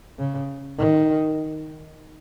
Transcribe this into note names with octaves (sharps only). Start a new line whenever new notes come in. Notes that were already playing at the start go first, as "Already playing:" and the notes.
C#3
D#3